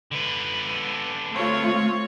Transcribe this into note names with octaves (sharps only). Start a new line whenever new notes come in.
D3 B4
A3 C4 F4 C#5